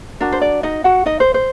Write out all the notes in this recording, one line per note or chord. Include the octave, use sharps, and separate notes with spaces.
D4 F#4 A#4
C5
D5
D#4 D#5
F#4 F#5
D#4 D#5
C5
C5